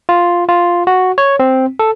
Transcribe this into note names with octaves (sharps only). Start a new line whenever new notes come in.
F4
F4
F#4
C#5
C4
A4